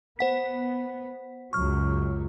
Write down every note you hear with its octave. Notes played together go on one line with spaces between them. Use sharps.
B3 C5 F#5 B6
C#2 F#2 F#3 C#6 F6